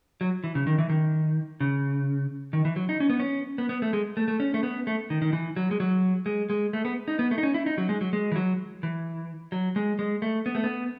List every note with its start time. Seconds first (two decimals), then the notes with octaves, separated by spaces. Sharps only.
0.21 F#3
0.44 E3
0.55 C#3
0.67 D#3
0.78 E3
0.89 D#3
1.60 C#3
2.53 D#3
2.65 E3
2.76 F#3
2.89 D#4
3.00 C#4
3.10 B3
3.20 C#4
3.58 B3
3.69 B3
3.82 A3
3.93 G#3
4.17 A3
4.28 A3
4.40 C#4
4.54 A3
4.63 B3
4.87 A3
5.10 D#3
5.22 D#3
5.33 E3
5.56 F#3
5.71 G#3
5.80 F#3
6.26 G#3
6.50 G#3
6.73 A3
6.85 B3
7.08 D#4
7.19 B3
7.31 A3
7.38 D#4
7.43 C#4
7.54 E4
7.66 D#4
7.78 F#3
7.89 G#3
8.01 F#3
8.13 G#3
8.32 E3
8.36 F#3
8.83 E3
9.52 F#3
9.76 G#3
9.99 G#3
10.22 A3
10.46 B3
10.55 A3
10.64 B3